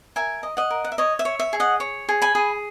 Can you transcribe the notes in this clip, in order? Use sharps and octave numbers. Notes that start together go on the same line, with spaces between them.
A#4 E5 G#5
D#5
D#5 F#5
A#4
F#5
E5
C#5 D#5
E5
C#5
E5
G#4
D#5 F#5
C#5
G#4
G#5 B5
G#4